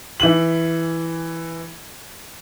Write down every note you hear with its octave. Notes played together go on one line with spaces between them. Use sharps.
E3 F#7